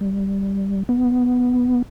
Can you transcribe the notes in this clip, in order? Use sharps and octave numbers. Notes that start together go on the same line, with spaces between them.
G3
B3